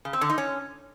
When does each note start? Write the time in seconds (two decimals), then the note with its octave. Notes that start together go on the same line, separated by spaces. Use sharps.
0.05 C#3
0.13 C4
0.21 D3
0.30 D#4
0.38 C#4